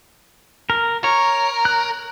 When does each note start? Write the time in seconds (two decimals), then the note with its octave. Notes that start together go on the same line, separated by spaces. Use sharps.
0.70 A#4
1.04 A#4 C#5
1.65 F#6